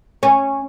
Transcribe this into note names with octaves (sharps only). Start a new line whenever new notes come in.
C#4